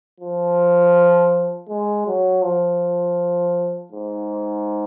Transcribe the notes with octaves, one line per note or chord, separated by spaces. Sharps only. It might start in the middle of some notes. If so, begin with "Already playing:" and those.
F3
G#3
F#3
F3
G#2